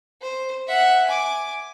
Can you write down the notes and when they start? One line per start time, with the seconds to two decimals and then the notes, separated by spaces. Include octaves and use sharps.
0.21 C5
0.67 E5 F#5
1.06 G#5 D6